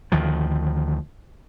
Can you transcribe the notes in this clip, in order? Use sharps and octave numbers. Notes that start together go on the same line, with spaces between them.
D2 D#3 F3